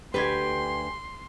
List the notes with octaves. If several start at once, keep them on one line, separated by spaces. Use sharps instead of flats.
D2 D4 G4 B4 G5 G#5 C6